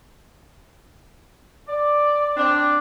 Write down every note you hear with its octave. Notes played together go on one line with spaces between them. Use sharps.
D5
C4 D4